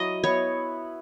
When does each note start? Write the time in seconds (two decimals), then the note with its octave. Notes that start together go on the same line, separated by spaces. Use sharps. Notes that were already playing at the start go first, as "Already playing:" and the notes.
Already playing: F#3 E4 D#5
0.24 B3 E4 C#5